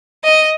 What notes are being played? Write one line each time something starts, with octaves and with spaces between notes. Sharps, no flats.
D#5